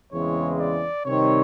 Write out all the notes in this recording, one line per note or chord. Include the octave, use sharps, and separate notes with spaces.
E2 C#3 E3 G#3 C4 C#5
D5
C3 D#3 G3 C4 D#4 C#5